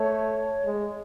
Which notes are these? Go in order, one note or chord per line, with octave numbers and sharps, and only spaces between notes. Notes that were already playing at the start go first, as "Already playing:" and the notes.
Already playing: A3 C#5
G#3